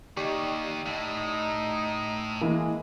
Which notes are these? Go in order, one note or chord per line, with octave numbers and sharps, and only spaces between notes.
D#2 D#4 G4 D5 C#6
A2 D#4
E3 G#3 A#3